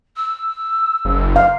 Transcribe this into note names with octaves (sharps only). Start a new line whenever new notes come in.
E6
F#1
F5